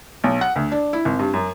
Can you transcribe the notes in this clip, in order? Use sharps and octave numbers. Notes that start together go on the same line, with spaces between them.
B1
F#5
D2
D4
E4
G#1
G2
F#2